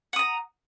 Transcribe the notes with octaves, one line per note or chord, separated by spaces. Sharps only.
F#5 A#5 D#6